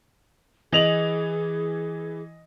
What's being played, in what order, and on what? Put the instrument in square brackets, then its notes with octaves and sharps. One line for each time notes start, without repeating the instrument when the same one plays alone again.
[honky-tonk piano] E3 [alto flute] G#4 [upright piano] D#5 F7 F#7